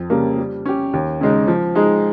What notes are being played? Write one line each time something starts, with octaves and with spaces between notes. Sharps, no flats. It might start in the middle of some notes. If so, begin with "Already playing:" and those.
Already playing: F2
C#3 G3 A#3
G3
C#4 G4
D#2
C#3 G#3 D#4
F3
G#3 D#4 G#4